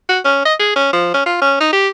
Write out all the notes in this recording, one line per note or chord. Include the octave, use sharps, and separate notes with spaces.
F#4
C#4
D#5
G#4
C#4
F3
C#4
F4
C#4
D#4
G4